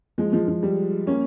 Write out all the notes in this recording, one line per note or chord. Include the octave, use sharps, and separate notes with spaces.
F3 G#3
F3 G#3
F3
G3
A#3 C#4